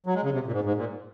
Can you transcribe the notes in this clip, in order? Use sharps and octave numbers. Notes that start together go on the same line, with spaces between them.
F#3
G#3
C#3
C3
A#2
G#2
G#2
A#2